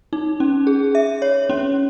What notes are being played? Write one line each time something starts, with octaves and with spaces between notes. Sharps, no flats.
D#4
C#4
G#4
E5
C#5
C#4